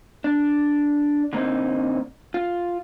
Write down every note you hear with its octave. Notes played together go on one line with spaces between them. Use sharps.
D4
D3 A#3 C4 D#4
F4